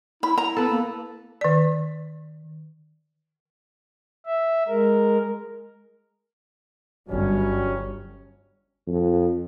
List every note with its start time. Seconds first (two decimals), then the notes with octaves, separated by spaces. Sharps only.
0.23 E4 B5
0.38 A#5
0.57 B3 A4 B4
0.69 A#3
1.41 D#3 D5
4.26 E5
4.68 G#3 A#4
7.08 G1 F#3 G3 C#4
8.87 F2